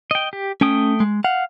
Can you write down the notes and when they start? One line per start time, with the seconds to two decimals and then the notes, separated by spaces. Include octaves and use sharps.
0.11 D#5 G5
0.33 G4
0.61 A3 C#4 G5 D#6
1.00 G#3
1.24 F5 F#5